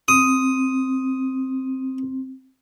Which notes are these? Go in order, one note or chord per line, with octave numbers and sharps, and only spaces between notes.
C4 D#6